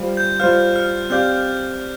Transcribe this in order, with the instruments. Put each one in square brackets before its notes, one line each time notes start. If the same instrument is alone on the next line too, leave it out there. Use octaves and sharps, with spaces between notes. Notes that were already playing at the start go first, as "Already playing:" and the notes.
Already playing: [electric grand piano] G3 F4 C5 F5
[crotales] G6
[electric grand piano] G3 F4 C5 F5 [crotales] F6
[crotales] F6
[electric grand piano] C4 G4 D5 F5 [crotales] G6